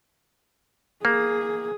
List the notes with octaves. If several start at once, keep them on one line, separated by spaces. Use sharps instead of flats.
A#3 G#4